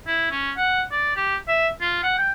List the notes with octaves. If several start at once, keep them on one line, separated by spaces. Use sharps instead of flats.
E4
C#4
F#5
D5
G4
E5
F4
F#5
G5